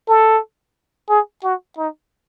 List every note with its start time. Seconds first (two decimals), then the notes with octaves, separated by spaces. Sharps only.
0.08 A4
1.09 G#4
1.43 F#4
1.77 D#4